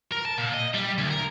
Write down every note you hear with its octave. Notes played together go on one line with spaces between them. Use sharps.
A#4
A5
A#2
D#5
G3
D2
A#4